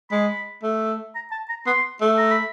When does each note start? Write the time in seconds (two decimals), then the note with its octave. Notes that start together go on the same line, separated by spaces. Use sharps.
0.11 G#3 B5
0.63 A3
1.15 A#5
1.32 A5
1.49 A#5
1.66 B3 C6
2.01 A3
2.18 A#5
2.31 B5